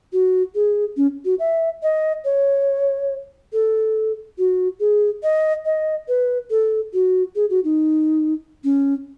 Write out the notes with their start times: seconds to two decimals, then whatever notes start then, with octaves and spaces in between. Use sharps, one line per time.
0.13 F#4
0.55 G#4
0.97 C#4
1.25 F#4
1.39 E5
1.83 D#5
2.25 C#5
3.53 A4
4.38 F#4
4.80 G#4
5.23 D#5
5.65 D#5
6.08 B4
6.50 A4
6.93 F#4
7.36 G#4
7.50 F#4
7.64 D#4
8.64 C#4